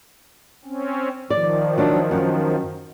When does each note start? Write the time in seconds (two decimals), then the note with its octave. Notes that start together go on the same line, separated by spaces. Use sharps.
0.65 C4 C#4
1.30 D#3 F3 D5
1.78 F#3 D4
2.11 F#2